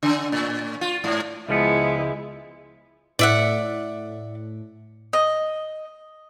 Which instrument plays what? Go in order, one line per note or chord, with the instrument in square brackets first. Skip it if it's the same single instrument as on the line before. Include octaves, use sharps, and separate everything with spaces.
[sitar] C#3
A2
F4
G#2
[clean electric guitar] C#2 F3 B3 [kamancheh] G#3 E4
[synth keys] A2 [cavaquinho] D5 E5 F#5
[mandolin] D#5